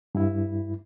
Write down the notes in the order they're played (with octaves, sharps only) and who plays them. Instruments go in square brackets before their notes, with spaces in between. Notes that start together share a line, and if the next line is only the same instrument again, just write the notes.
[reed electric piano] G2 E4